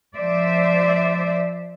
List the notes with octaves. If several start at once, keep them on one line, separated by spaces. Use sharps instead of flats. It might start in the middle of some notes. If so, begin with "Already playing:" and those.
F3 C5 D5 E5